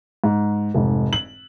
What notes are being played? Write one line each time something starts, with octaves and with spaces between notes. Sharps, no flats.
G#2
F1 G#2
F#7